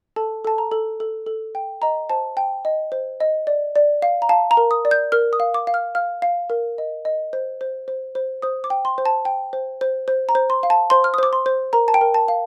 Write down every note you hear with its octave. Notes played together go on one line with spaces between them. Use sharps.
A4 A5
A4 A5
A#5
A4
A4
A4
G5
D#5 A#5
C5 A5
G5 A5
D#5
C5
D#5
D5
D5
F5
A#5
F5 A5
A#5
A#4
D#6
D5
G6
A#4 F6
D#6
F5
D6
F5
F6
F5 F6
F5
A#4
D#5
D#5
C5
C5
C5
C5
C5 D#6
D6
G5
C6
C5
A5
G5
C5
C5
C5
A#5
C5
C6
F5
A5
C5 C6
F6
D#6
C5 D6
C6
C5
A#4 A#5
A5
G5
A#4
A5
F5